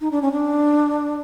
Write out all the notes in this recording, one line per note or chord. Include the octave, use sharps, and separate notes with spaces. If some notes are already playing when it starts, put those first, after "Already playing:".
D#4
D4
C#4
D4